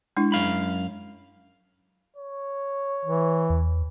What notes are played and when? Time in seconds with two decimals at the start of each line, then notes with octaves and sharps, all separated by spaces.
0.17 G#3 D4 E4
0.32 F#2 F5 B5
2.16 C#5
3.05 E3
3.50 E2